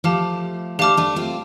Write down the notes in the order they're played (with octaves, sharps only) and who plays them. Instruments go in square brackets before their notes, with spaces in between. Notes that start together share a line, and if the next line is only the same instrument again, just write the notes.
[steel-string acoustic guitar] F3 A3 [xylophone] G4 F5 A5 D6 F6
[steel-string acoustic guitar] A3 D4 [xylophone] G4 F5 A5 D6 F6
[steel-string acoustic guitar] A3 D4
C4 F4